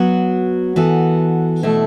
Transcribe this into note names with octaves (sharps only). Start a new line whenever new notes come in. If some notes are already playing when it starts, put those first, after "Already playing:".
Already playing: F#3 B3 F#4
E3 B3 F#4 A4
B2 A3 E4 A4